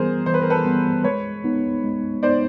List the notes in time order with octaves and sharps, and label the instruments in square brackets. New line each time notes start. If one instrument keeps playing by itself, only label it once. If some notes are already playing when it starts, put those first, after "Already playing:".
Already playing: [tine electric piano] E3 G3 B3 [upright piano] G#4 A#4 C5
[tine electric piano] E3 [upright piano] C5
[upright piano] B4
A#4
A4 B4
[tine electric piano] G3 B3
[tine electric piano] G#3 [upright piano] B4 C#5
[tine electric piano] B3 D#4
G#3
[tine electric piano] B3 D#4 [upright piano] C5 D5